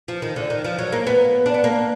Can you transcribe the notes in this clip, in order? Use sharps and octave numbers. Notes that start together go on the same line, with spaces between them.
F3
D#3
D3
D#3
F3
F#3
A#3
B3
D4
B3
A#3